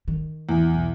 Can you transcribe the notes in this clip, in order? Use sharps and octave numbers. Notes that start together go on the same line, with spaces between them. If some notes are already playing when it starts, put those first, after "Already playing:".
D#3
E2
B1